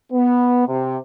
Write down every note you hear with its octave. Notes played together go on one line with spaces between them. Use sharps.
B3
C3